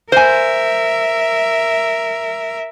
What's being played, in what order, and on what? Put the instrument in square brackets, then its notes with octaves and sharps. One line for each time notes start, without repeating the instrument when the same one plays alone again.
[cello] A#4 E5 [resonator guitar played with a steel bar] C5 G#5